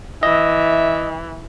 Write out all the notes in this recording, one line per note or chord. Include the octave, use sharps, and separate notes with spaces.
E3 D#5 E5